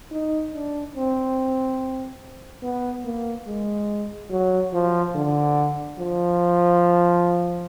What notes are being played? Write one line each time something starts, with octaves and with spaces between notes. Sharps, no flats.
D#4
D4
C4
B3
A#3
G#3
F#3
F3
D3
F3